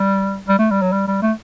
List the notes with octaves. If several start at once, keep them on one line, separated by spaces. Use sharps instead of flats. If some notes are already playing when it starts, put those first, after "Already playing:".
Already playing: G3
G3
A3
G3
F#3
G3
G3
A3